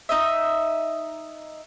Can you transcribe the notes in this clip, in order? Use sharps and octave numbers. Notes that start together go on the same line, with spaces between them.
D#4 D#5 E5